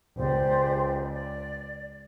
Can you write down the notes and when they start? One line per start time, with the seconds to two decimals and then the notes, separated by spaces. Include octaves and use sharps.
0.18 C#2 G4 C5 D5
1.11 D5